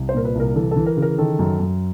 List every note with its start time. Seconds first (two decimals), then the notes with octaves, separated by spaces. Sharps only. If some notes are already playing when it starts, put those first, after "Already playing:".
Already playing: C2
0.09 C5
0.14 A#2 A#4
0.25 B4
0.35 C2 A#4
0.56 E3 A4
0.71 A4
0.77 E3
0.86 A#4
0.97 C#3
1.02 A#4
1.18 D#3 A4
1.39 F#2
1.59 F#2